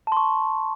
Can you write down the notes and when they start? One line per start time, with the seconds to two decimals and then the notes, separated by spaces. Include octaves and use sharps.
0.07 A5
0.12 C6
0.17 C#6